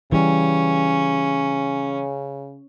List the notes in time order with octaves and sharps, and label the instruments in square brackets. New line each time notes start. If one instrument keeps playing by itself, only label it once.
[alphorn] C#3 [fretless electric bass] E3 G3 [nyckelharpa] C#4